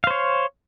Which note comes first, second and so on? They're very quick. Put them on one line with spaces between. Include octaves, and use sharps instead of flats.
F5 C5 C#5